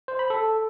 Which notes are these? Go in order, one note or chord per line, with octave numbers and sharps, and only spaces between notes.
C5
B5
A4